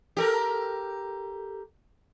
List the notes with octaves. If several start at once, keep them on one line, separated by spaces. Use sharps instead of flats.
G4 A4 A#4